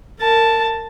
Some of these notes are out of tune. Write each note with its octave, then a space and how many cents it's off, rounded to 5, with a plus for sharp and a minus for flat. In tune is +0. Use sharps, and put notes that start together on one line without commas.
A#4 -25 A5 +0